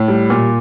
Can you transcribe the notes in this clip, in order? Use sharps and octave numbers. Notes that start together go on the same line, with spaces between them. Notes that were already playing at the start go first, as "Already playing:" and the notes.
Already playing: A2
G3
A#2